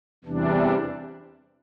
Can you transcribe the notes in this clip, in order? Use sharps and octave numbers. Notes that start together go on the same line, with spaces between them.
E2 C3 E3 G3 D4